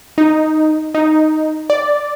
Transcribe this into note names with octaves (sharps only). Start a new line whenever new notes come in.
D#4
D#4
D5